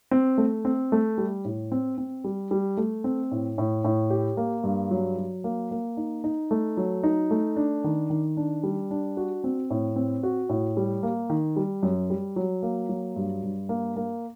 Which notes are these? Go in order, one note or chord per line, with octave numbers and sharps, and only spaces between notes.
C4
A3
C4
A3
G3
A2
C4
C4
G3
G3
A3
C4
A2
A2
A2
G4
A#3
G2
F#3
F#3
A#3
A#3
D#4
D#4
A3
F#3
D#4
A3
D4
D#3
D#3
D4
G3
D4
F#4
C4
A2
C4
F#4
A2
G3
A#3
D#3
G3
F#2
G3
F#3
A#3
F#3
G2
G2
A#3
A#3